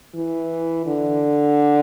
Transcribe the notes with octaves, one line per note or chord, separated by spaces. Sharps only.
E3
D3